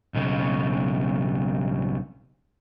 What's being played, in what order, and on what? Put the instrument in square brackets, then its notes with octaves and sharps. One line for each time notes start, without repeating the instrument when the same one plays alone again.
[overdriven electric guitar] B1 C#3